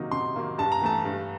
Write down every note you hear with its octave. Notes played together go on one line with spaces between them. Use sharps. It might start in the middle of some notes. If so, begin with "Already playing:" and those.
Already playing: C3 D#3 F#3 A#3 D#4
C3 C6
D#3 F#3 A#3 D#4
G2 A5
A#5
E3 A3 A5
G2